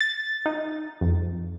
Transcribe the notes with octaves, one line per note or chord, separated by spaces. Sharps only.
A6
D#4
F2